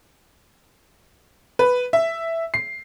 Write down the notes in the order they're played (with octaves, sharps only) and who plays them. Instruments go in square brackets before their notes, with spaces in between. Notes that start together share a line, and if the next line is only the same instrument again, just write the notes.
[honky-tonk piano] B4
E5
C7